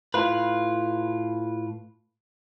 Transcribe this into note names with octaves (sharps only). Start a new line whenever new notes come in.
A2 F4 B4